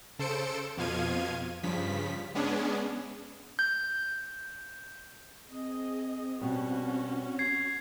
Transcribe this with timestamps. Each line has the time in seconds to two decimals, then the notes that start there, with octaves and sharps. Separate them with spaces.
0.19 C#3 A4 C5 C#7 D7 E7
0.77 F2 B2 F3 F5 G#6 D#7
1.63 G2 C#3 F3 B6
2.35 G#3 B3 C#4 D4 G#4
3.59 G6
5.49 C4 G#4 D#5
6.41 B2 G3 C#4 F#4
7.39 G#6 C7